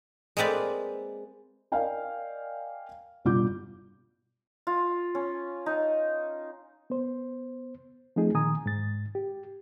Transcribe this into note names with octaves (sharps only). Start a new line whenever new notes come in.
G#3 A#3 C4 B4 D5
A#4 D5 D#5 F5 G5 G#5
G1 B2 G3 F4 D6 G6
F4
C#4
D#4
B3 C5
F3 A3 C4 D#4 G#4
A#2 D#3 G#5 A#5 D#6
G#2 A6
G4